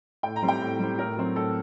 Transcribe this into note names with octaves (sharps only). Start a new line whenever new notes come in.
A2 G5
A#5
G3 C4
G5
A2
G3 C4
A2 A#4
F#3 C4
A2 A4